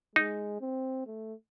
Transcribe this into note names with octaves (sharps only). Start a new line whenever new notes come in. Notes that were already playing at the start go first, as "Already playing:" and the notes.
G#3 D#4
C4
A3